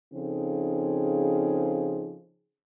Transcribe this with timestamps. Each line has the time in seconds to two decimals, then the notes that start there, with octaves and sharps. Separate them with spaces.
0.14 C#3 F3 C4 D#4 G#4 A4